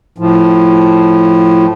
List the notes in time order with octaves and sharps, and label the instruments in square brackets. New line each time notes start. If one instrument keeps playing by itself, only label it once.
[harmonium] A2 F3